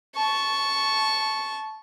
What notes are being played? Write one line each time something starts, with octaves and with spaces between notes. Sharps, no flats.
A5 C#6